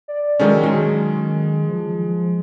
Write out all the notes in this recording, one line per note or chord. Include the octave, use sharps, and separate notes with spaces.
D5
D#3 F#3 G#3 C#4 A4
D#3 F#3 G#3 C#4
F3